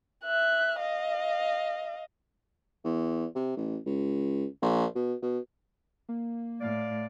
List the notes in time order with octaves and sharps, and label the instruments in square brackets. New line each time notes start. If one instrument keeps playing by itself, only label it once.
[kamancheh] E5 F#6
D#5 F5
[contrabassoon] E2
C3
A1
C#2
A#1
B2
B2
[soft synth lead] A#3
[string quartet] A2 [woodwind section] D5 F5